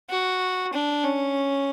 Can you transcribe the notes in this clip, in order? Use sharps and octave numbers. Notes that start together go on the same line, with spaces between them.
F#4
D4
C#4